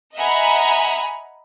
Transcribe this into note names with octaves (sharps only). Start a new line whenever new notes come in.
D#5 E5 F#5 G#5 A#5 B5